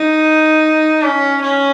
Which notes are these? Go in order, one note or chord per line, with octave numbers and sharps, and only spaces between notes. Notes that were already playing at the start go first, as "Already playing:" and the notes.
Already playing: D#4
C#4
C#4